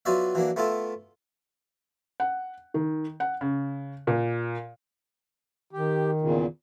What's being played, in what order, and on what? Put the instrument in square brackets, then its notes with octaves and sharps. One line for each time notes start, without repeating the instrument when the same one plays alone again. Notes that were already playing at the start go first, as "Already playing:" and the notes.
[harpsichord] F#3 B3 F4 F#4 D5 E5
E3 F#3 A#3 D4
A3 B3 E4 F4 A4
[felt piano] F#5
D#3
F#5
C#3
A#2
[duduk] D#3 [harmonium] G4
[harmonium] E2 A#2 C#3